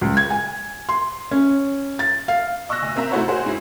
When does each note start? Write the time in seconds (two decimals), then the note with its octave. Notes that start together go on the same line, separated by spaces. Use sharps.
0.01 C#2
0.17 G#6
0.30 G#5
0.89 C6
1.31 C#4
1.99 A6
2.28 F5
2.69 D#5 C#6 E6 F#6 A#6
2.82 D2
2.96 A#3 C4 E5 A#5
3.11 A3 D#4 E4 F#4 C5 C#5
3.28 F#4 G#4 A#4 C5
3.46 G#2 E4